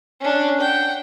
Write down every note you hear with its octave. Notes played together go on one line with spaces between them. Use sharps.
C#4 D4
F#5 G5